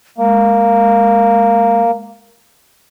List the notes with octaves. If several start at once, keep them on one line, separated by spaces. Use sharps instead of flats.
G#3 A#3